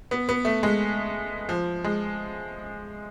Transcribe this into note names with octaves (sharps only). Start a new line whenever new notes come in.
B3
B3
A3
G#3
F3
G#3